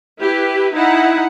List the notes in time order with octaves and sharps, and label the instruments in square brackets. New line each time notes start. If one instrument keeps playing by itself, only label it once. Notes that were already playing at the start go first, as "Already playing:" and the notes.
[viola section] E4 G4 B4
D#4 E4 F#5